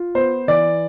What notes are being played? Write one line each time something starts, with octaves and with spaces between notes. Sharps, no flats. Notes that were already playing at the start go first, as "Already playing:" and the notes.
Already playing: F4
B3 C5
E3 D5